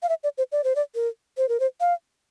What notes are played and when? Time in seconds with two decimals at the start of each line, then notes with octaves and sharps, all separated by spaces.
0.03 F5
0.09 E5
0.24 D5
0.38 C5
0.52 D5
0.64 C5
0.76 D5
0.95 A#4
1.37 C5
1.49 A#4
1.60 C5
1.81 F5